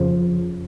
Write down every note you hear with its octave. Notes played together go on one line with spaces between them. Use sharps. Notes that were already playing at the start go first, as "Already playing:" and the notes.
Already playing: F2 C#3 F3